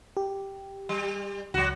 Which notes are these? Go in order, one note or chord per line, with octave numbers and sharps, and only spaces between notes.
G4
G3
C#2 F#3 F#4